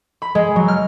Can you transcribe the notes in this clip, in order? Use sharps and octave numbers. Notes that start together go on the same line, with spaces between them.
B5
G#3
F#3
F6